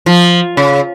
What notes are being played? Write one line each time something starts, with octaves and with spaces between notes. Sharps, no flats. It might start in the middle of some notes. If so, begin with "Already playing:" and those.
F3
C#3